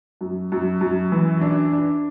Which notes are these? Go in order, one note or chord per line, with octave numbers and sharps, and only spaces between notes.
F#2
F#2
F#2
E3
D4
D4